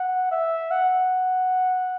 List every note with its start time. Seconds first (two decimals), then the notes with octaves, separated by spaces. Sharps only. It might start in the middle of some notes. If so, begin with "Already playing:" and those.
Already playing: F#5
0.31 E5
0.71 F#5